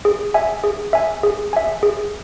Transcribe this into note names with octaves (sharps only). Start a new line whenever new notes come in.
G#4
E5 G#5
G#4
E5 G#5
G#4
E5 G#5
G#4